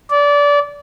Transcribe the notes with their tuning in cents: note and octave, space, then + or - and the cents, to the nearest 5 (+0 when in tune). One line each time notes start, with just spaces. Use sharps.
D5 -25